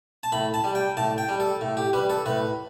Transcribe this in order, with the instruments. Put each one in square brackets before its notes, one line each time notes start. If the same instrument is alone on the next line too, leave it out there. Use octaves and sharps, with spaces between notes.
[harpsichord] A5
A2 B5
A5
G3
G5
A2 A5
G5
G3
A4
A2
G4
G3 B4
A4
A2 B4